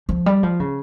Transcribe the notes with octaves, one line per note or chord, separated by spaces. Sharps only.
F3
G3
F3
C#3